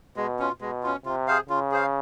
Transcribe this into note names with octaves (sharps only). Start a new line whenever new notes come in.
B2 G#3
C#4 F4
B2 G#3
C#4 F4
C3 F4
G#4 C5 F5
C#3 F4
G#4 C5 F5